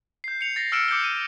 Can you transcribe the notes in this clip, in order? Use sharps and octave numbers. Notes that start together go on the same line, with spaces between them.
G6 C7
C#7 F7
A6 A#6 C7
E6 F6 C#7 D7 E7
D6 G6 C#7 G7
D#7